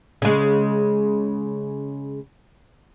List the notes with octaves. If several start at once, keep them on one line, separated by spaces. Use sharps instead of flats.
C#3 G#3